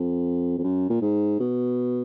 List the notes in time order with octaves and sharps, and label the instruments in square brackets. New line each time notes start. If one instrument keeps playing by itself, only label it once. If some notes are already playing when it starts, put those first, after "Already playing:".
Already playing: [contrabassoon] F2
F2
F#2
A#2
G#2
B2